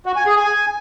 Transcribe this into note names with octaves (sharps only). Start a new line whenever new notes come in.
F#4
G#5
G#4
G#5